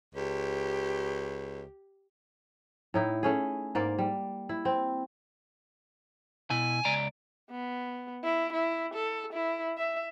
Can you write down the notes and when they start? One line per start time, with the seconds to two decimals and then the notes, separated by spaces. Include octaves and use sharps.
0.14 C#2 G4
2.94 A2 D#4 E4
3.23 A3 C#4 G#4
3.75 G#2 A#3 D5
3.99 G3
4.49 E4
4.65 C4
6.50 B2 E4 G#5
6.85 C#2 D5 A#5
7.51 B3
8.24 E4
8.53 E4
8.94 A4
9.33 E4
9.78 E5